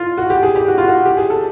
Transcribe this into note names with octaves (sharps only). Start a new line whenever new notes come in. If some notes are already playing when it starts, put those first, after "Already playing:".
Already playing: F4
F#4
G4
G#4
G4
F#4
F4
F#4
G4
G#4
A4